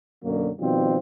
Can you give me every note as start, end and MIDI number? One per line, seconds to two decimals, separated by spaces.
0.24 0.50 42
0.24 0.50 47
0.24 0.50 50
0.24 0.50 54
0.24 0.50 58
0.60 0.97 47
0.60 0.97 51
0.60 0.97 53
0.60 0.97 55
0.60 0.97 60